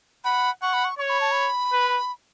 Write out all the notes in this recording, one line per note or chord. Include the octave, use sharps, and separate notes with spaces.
F#5 B5
F#5 C#6
B5
C#6
C#5 C#6
B5
A5
B5
B4